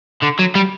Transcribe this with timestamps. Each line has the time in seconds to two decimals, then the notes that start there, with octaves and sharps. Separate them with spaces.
0.23 D3
0.39 F#3
0.55 G3